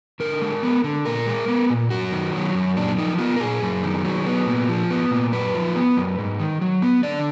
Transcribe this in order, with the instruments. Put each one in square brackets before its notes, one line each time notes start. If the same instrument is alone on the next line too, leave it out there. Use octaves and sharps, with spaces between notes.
[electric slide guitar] D3 A#4
G#3
B3
D3
A#2 A#4
G#3
B3
A#2
F#2 F#4
D#3
F#3
F#2
A#2 D4
F3 D#4
B3 F4
A#4
A#2 G#4
F#2
D#3
F#3
B3
A#2
F3
B3
A#2
F#2 B4
F3
B3
F#2
G#2
D#3
F#3
B3
D3 D5